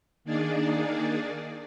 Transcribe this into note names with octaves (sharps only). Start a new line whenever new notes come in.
D#3 A#3 D4 D#4 G#4 D5